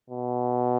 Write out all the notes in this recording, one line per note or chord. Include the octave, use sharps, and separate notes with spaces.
B2